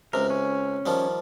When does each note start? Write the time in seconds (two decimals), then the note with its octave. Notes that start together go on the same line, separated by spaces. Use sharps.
0.13 C#2 C3 A#4
0.30 C#4
0.86 D#3 F3 G3